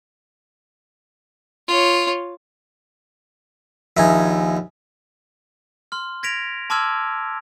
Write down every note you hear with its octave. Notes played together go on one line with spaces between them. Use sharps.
F4 C#5
A#1 D#2 D#4 E5 G#5
C6 F6
G#6 A#6 B6 D7 F7
A5 C6 D6 E6 F6 G#6